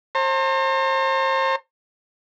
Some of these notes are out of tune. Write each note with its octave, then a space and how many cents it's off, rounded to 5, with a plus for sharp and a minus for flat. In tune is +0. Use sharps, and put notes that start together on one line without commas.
C5 +35 A#5 -40